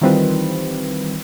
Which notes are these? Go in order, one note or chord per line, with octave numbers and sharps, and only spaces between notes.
D#3 E3 G3 C4 F4 B4